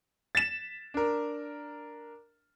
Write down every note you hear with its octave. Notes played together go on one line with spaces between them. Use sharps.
A6 B6 E7
D4 A#4